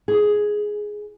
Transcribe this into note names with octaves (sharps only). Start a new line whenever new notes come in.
G#4